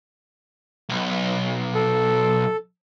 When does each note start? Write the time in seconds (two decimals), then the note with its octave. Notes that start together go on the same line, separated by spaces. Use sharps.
0.89 B1
1.75 A4